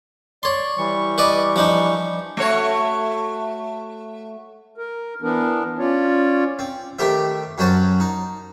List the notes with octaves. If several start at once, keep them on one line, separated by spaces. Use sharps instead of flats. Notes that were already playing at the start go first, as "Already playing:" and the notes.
C#5 D5 C6
E3 G3 C#6
B4 D5 D#5
F3 D4 D#4
A3 F#4 C#5
A#4
E3 B3 D4 A#4
C#4 F4 C#5 D5
C4
D#3 A3 G4 C5 E5
F#2 F#3 C#4 F#4 C5 A5
D#4